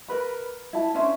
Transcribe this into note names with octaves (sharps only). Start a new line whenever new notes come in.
A#4 B4 B5
E4 A5
C#4 D4 C5 E5